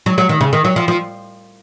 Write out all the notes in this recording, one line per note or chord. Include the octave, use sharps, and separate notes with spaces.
F#3
F#3
D#3
C#3
D#3
F#3
F3
F3